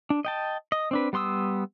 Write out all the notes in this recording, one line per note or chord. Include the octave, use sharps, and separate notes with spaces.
D4
D#5 G5 A5
D#5
C4 D4 B4
G3 B3 C6 D#6 E6